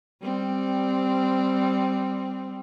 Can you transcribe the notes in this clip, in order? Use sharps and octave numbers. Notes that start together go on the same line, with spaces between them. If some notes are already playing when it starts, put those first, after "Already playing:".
G3 C4